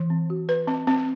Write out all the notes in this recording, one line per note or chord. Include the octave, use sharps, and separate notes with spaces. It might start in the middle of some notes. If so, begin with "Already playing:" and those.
Already playing: E3
C4
F#4
B4
C4
C4